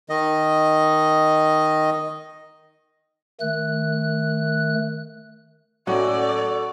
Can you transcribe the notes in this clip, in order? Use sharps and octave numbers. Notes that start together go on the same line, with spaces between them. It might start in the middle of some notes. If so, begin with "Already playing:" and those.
D#3 D#5
D#3 A3 F#6
A2 F#3 C#4 F#4 A4 D5